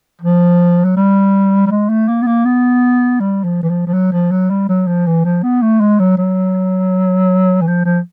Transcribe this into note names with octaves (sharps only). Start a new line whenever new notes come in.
F3
F#3
G3
G3
G#3
A3
A#3
B3
A#3
B3
G3
F3
E3
F3
F3
F#3
F3
F#3
G3
F#3
F3
E3
F3
B3
A3
G#3
F#3
F#3
E3
F3
F3